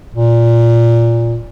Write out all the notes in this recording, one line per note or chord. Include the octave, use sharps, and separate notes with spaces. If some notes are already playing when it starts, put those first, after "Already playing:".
A#2